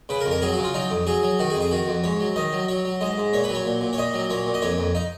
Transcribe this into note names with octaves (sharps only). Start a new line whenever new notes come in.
C#3 B4
A#4
F2
A#4
F#3 G#4
F#4
C#3
F4
F#3 D#4
F2
F#3 G#4
F#3
D#3 F#4
G#4
F2
G#4
D#3 F#4
F2
G#2 C#5
F#3
D#3 D#5
F#3
F#3 C#5
F#3
G#2 D#5
G#2
A#2 C#5
B4
F#3
C#5
A#2
A#2
C#5
A#2 D#5
F#3
A#2 C#5
A#2
D#5
F2 C#5
F2
D#4